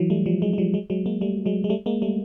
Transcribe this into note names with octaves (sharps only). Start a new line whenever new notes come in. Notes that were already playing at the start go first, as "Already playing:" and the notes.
Already playing: E3 F#3
G3 A3
F3 G3
F#3 G#3
G#3
F3 G3
F#3 G#3
F#3 G#3
G#3 A#3
G3 A3
F#3 G#3
G#3
G3 A3
G#3 A#3
G3 A3